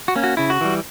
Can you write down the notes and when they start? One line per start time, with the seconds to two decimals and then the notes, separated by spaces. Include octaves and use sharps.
0.08 F#4
0.16 A#3 C#4
0.24 F#4
0.37 C#3 E4
0.50 F#4
0.61 E3 G3